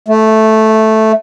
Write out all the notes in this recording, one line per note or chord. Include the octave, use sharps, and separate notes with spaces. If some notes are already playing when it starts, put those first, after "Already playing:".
A3